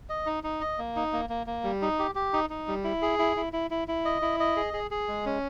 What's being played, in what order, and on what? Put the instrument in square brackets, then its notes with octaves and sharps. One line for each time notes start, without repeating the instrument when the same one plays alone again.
[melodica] D#5
D#4
D#4
D#5
A#3
D#4
A#3
A#3
A#3
G3
D#4
G4
G4
D#4
D#4
G3
E4
G#4
E4
E4
E4
E4
E4
D#5
E4
D#5
G#4
G#4
G#4
G#3
C#4